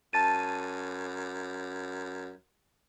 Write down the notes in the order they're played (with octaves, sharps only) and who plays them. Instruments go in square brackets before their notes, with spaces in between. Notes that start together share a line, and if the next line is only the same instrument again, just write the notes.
[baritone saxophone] F#2 [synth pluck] A5 A6 D#7